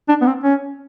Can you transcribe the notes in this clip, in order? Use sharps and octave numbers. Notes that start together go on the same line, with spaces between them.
D4
B3
C4
C#4